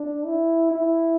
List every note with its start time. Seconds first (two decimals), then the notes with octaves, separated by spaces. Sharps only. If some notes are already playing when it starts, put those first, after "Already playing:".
Already playing: D4
0.26 E4
0.71 E4